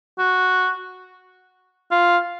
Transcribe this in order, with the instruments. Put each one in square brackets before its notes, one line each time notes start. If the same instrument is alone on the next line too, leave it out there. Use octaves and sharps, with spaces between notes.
[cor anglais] F#4
F4